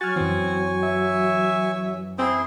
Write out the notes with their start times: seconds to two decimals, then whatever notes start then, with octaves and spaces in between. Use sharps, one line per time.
0.01 F#3 F#4 G#5 C#6 F6 A6
0.16 F#2 E3 C4
0.83 E5
2.18 C4 E4 G#4 C6